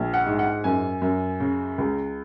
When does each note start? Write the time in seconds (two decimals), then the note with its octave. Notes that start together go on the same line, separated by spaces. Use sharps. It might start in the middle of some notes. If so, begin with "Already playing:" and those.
Already playing: A#1
0.14 F#5
0.26 G#2
0.39 F#5
0.64 F#2 G#5
1.02 F#2
1.40 C#3
1.78 C#2